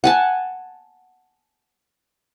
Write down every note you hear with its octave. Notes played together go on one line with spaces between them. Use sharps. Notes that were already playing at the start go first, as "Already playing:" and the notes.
F#5 G#5 A5